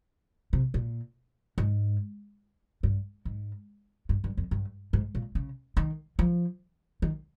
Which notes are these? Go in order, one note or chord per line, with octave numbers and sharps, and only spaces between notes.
C3
A#2
G#2
G2
G#2
G2
G2
F2
G2
G#2
A#2
C#3
D#3
F3
D#3